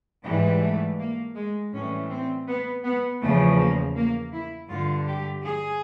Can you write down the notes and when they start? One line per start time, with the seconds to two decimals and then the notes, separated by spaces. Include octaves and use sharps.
0.24 G#2 E3 G3
0.61 A3
0.99 A#3
1.35 G#3
1.73 A2 E3 G3 C#4
2.10 C4
2.47 B3
2.85 B3
3.21 E2 C#3 F3 A3
3.58 A#3
3.96 A#3
4.32 E4
4.70 G2 D3 G3 F4
5.08 G4
5.44 G#4